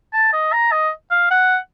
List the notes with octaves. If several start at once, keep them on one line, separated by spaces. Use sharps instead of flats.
A5
D#5
A#5
D#5
F5
F#5